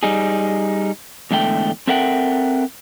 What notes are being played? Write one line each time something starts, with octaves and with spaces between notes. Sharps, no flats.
G3 D#4 G#4
E2 G#2 D3 A3 G5
C4 A4 A#4 E5 F#5 G5